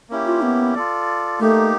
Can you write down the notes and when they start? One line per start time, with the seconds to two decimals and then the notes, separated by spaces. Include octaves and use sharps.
0.09 A#3 C#4 E4 G4
0.26 F4
0.42 B3
0.74 F4 A4 D5
1.40 A3 A#3 D#4 G4